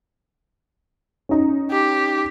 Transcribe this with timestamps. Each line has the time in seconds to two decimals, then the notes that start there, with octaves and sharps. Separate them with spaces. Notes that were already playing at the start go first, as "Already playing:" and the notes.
1.29 C#4 D#4
1.71 G4